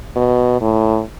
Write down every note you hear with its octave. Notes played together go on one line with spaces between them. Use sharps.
B2
A2